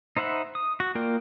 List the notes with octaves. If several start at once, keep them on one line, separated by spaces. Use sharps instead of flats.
D#4 C5 E5 F#5 B5
D#6
F#4
A#3 F4 A#4 D5 G5